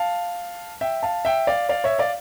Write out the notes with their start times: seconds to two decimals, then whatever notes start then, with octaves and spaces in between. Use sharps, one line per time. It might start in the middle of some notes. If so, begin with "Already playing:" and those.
Already playing: F5 A5
0.81 E5 G5
1.03 F5 A5
1.25 E5 G5
1.47 D5 F5
1.69 D5 F5
1.84 C#5 E5
1.99 D5 F5